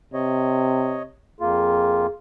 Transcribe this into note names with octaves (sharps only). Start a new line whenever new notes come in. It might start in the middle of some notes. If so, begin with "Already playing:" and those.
C3 C#5 D#5
F2 A#3 F4 G#4